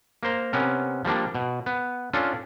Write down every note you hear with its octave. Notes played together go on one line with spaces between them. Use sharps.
A#3 A#4 C5 A#5
C3 B3 C#4 A#4
F3 G3 A#3 D4
B2
B3
C#4 D4 F4 A4